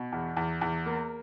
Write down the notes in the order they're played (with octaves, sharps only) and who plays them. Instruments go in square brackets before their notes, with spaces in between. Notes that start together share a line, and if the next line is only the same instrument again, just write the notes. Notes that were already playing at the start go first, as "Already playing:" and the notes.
Already playing: [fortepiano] B2
E2
E2
E2
A#3